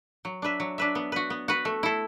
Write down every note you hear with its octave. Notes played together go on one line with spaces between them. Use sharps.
F#3
D4 B4 E5
F#3
D4 B4 E5
B3
F#4 B4
B3
F#4 B4
A3
E4 A4